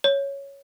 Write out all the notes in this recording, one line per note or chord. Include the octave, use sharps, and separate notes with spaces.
C#5